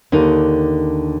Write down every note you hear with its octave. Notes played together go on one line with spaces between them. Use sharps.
D#2 D3 D#4